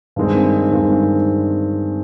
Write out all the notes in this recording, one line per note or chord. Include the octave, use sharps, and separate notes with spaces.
G2 D#3 G#3 C4
G2 D#3 G#3 C4